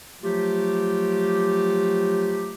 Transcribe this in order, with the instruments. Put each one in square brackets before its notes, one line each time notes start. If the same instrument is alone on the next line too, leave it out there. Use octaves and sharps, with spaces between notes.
[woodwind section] F3 F#3 A3 F4 G4